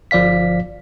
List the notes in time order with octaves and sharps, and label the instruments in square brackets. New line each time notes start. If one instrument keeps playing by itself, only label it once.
[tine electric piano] G1 F3 D5 F5 B6